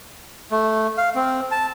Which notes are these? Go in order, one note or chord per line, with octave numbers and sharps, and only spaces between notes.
A3
F5
C4
A5